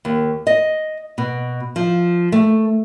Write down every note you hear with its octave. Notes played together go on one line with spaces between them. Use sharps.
D#2
D#5
B2
F3
A3